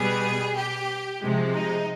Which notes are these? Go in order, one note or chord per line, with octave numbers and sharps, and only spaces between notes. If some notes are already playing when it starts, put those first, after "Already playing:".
Already playing: B2 G3 B3 G#4
G4
C3 F3 G#3
D#4